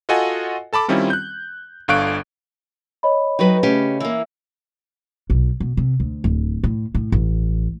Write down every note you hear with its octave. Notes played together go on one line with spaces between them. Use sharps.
F4 F#4 A4 D#5 F#5 G#5
A4 A5 B5 D6
D#3 G3 C4 C#4 E4 F4
F#6 G6
G1 D3 F5 C#6 F#6 D7
C#5 D#5 B5
F#3 D#4 F#4 B4 G5
C#3 A3 C#4 G4 F5
E3 A#3
B1
B2
C3
D2
D1
A2
A2
A1